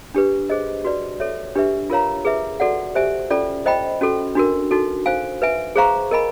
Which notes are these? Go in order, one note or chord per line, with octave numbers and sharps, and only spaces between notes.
D4 G4 B4
G#4 C5 D#5
F#4 B4 D5
A4 C#5 E5
D4 G4 B4 E5
F4 A#4 C#5 F5 A#5
G#4 B4 E5
F#4 A4 D5 F#5
G4 C5 E5 G#5
C#4 F4 A4 D5
C5 D#5 G5 B5
C#4 F#4 A4
D4 F#4 A#4
D#4 F#4 A4
C5 F5 G#5
B4 E5 G#5
G#4 C5 F5 A#5 C#6
A#4 D#5 G#5 B5